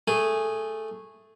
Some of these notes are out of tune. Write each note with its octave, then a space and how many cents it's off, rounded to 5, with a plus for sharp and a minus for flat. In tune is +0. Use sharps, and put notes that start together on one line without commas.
A3 +0 G#4 -10